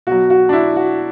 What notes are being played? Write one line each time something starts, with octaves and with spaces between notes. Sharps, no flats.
B2 F#3 F#4
F#4
D4
E4
F#4